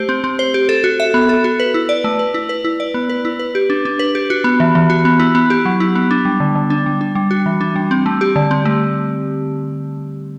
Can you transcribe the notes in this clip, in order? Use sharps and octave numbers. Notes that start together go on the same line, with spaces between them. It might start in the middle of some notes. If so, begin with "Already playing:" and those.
Already playing: A3 G4 C5
C4
C4
C5
G4
A4
F#4
E5
B3
A4
F#4
B4
E4
D5
A3
B4
E4
B4
E4
D5
B3
B4
E4
B4
G4
D4
D4
B4
G4
F#4
B3
E3
E3
F#4
B3
E4
B3
G4
F#3
E4
B3
D4
G3
D3
D3
D4
G3
D4
G3
F#4
E3
D4
G3
C4
A3
G4
D3
C4
A3